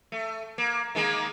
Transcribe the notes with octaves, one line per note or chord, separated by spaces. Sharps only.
A3
A#3
D#3 G#3 A#3